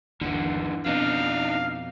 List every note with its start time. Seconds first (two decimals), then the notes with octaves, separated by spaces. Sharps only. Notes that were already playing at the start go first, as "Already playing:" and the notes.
0.21 G1 D#2 D3 E3
0.86 F2 B2 D4 D#4 F5